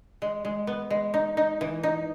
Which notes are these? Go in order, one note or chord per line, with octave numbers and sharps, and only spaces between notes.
G#3
G#3
B3
G#3
D#4
D#4
E3
D#4